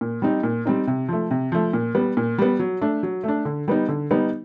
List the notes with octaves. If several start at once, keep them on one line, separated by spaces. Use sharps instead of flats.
A#2
G3 C4 D#4
A#2
G3 C4 D#4
C3
F3 A3
C3
F3 A3
A#2
G3 B3
A#2
G3 B3
F#3
A3 D4
F#3
A3 D4
D3
G3 B3 D#4
D3
G3 B3 D#4